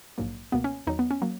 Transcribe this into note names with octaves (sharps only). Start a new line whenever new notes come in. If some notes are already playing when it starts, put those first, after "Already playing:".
A#1 G#2 F#3 A#3
C#2 B2 A#3 B3
C#4
E2 D#3 F#3 D#4
B3
C#4
F#3 A#3